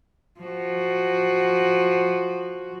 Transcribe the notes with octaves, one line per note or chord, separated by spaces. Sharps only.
F3 F#4